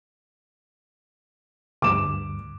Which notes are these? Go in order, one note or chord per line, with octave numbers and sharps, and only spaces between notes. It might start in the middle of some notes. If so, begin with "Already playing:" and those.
D2 G2 D6 E7